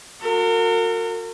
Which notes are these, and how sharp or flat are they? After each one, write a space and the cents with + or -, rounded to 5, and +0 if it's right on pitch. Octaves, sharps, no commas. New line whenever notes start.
F#4 -35 A#4 -40